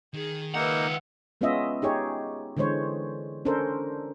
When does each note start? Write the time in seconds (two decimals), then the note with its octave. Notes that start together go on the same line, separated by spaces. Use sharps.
0.14 D#3 G#4
0.55 C#2 A#3 D#4 B4 E5 F#5
1.41 G#3 B3 C#4 F4 D#5 E5
1.82 D#4 G4 G#4 C#5
2.57 D3 E3 G#3 C5 C#5
3.45 C#4 D4 A4 A#4 C5